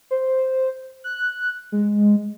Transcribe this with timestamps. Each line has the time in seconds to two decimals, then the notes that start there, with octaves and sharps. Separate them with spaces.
0.11 C5
1.04 F#6
1.72 G#3